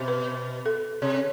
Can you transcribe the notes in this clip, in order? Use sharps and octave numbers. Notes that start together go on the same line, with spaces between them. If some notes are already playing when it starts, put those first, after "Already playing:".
Already playing: B2
B4
A4
C3